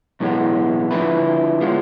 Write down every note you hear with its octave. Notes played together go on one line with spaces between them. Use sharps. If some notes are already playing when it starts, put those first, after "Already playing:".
B1 A2 E3 G#3 B3
D3 F3 A3 E4 B4
F3 G#3 B3 F4